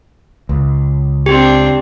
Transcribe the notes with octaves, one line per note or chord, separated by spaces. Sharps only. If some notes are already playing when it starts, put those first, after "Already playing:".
C#2
C4 D4 G4